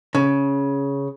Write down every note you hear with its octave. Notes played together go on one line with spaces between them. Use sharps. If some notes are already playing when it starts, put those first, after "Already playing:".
C#3